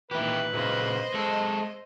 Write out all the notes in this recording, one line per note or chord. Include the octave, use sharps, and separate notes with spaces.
A#2 D#3 E3 E4 G4 B4
A#2 C#3 C5 D#5
G#3 A4